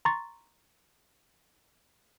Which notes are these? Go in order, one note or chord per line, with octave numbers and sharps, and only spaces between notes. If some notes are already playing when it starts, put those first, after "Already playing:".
A#5 C6 C#6 A6